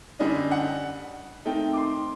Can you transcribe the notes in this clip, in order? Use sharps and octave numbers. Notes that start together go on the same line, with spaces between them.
F#2 D3 G3 D4 D#5
F#5
D#3 A3 C4 D#4 G5
D6
C6